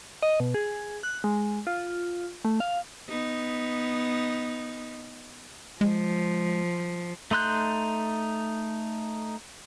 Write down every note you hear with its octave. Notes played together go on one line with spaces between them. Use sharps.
D#5
B2
G#4
F#6
G#3
F4
A3
F5
B3 D#4
F3 G#3
A3 D#4 C6 F#6 G6